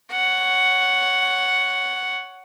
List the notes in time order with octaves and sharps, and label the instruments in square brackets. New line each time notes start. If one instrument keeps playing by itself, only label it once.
[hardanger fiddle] C#5 F#5